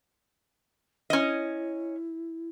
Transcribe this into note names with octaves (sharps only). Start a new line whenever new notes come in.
C#4 E4 D#5